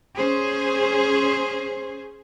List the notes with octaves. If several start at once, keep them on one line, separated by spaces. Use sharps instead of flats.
C#4 G#4 C5